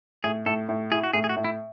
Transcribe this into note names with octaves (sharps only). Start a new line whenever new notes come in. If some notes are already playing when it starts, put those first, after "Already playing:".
A2 G#4
A2 A4
A2
E4 G#4
F#4
A2 G#4
G#4
F#4
A2
E4